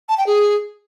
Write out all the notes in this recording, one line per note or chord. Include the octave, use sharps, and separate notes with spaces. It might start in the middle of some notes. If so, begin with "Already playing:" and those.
A5
G5
G#4